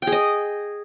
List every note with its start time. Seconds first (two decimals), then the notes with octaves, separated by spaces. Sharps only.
0.02 G5
0.07 G#4
0.12 D#5